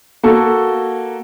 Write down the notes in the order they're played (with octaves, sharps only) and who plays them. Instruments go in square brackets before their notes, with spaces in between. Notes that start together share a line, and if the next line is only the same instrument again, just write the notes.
[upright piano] A#3 F#4 A4